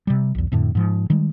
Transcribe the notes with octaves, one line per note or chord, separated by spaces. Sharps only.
C3 G3
B1 E2
F2 A2 D3
G#2 F3
D#3 G3 G#3